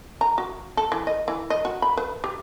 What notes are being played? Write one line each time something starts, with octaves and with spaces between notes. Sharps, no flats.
A#5
F#4
A4
E3
D#5
E3
D#5
F#4
B5
B4
G4